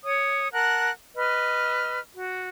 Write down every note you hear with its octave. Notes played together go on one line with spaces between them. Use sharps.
C#5 D#6
A#4 F#5 A5 F#6
B4 D#5 F6
F#4